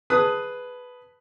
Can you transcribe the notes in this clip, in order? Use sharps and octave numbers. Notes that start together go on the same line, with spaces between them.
G#4 B4 A5 B5 D#6